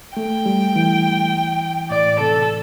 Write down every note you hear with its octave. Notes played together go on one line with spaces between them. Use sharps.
A3 G5
G3
E3
A2 D5
C3 A4